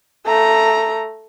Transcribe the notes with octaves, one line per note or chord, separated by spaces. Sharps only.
A3 A#5